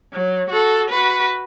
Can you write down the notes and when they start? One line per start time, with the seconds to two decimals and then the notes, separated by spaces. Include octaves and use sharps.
0.13 F#3
0.50 F#4 A4
0.90 F#4 B4